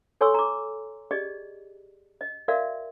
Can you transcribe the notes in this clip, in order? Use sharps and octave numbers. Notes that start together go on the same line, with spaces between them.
A4 C#5 G#5 C6 C#6 E6
A#5 D6
G4 G#4 D5 D#5
D#5
F#4 A#4 D5 E5 F5